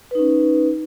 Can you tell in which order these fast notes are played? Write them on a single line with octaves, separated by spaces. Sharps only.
B4 D#4 C#4